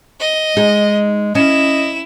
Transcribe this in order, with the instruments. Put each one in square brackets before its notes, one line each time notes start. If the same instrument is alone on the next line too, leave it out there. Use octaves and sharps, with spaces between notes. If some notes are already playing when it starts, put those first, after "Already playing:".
[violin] D#5
[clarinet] G#3 [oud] D#4 G#4
[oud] C#4 [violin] E4 E7 [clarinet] D#5